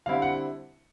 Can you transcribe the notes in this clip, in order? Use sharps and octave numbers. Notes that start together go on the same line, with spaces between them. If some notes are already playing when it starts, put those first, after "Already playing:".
D3 G3 C4 E4 F5
F#5